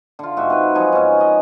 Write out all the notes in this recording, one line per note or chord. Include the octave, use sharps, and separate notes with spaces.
D3 F4
G#2 F#4 E5
C4 B4
F3 F#3 D#4 G#5
G#2 C#4
D#5